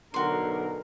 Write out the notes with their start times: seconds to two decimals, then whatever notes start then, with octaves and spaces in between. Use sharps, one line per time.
0.14 B1 D3 F#4 A#4 C6